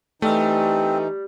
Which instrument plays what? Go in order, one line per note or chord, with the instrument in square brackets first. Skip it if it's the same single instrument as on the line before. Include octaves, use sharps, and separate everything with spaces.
[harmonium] E3 D#4 [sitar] G3 [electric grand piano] A3 [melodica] C4